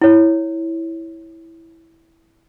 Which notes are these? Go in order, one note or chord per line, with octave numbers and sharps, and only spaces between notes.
E4 C#5